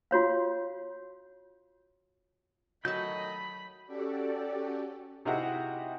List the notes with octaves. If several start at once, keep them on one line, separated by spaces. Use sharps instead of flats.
F4 F#4 C#5 F5
D#3 F#3 A3 D#5 A5 B5 G6
C#4 F#4 G4 A4 D5
C3 D#4 E4 F#4 G#4